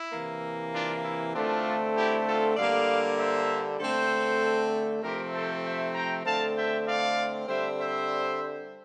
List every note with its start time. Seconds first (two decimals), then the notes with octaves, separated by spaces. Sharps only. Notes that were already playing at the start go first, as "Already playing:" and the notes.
Already playing: E4
0.12 C3 E3 A#3
0.73 D4 F4
1.03 E4
1.34 D3 A3 C4 D4 F4
1.95 E4 G4
2.26 F4 A4
2.57 D3 G3 A#3 D5 F5
3.18 C5 E5
3.80 D3 A3 C4 A4 C5
5.02 C3 F3 A3 C4 G4 A#4
5.33 A4 C5
5.63 E5 G5
5.94 G5 A#5
6.25 D3 A3 C4 F5 A5
6.56 E5 G5
6.86 D5 F5
7.47 D3 G3 C4 C5 E5
7.79 C5 E5